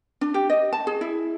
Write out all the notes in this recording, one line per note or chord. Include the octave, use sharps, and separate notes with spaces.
D4
G4
D#5
A5
G#4
E4